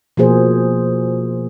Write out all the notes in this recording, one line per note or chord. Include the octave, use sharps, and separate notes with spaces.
B2 F3 A#3 G#4 C5